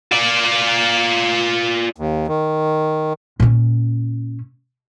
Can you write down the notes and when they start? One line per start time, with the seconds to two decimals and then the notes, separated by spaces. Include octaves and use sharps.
0.12 F4 D5
1.96 D#2
2.27 D#3
3.40 A#2 C#4